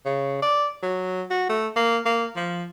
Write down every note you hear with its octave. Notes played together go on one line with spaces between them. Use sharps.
C#3
D5
F#3
F#4
A3
A#3
A#3
F3